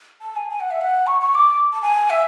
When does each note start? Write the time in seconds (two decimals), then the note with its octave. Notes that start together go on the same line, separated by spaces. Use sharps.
0.21 A5
0.36 G#5
0.50 G#5
0.60 F#5
0.71 E5
0.81 F#5
1.07 C#6
1.21 C#6
1.35 D6
1.73 A5
1.82 G#5
2.10 E5